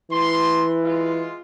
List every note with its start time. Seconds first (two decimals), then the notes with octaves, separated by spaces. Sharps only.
0.11 E3 C6
0.82 G#3 F4